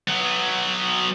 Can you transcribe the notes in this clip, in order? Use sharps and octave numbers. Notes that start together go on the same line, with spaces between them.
F#3 B3